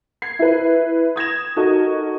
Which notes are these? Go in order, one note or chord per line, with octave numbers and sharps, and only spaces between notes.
G#6 C7
E4 B4
D#6 G#6 A#6 E7
D#4 F#4 A4 A#4 D#5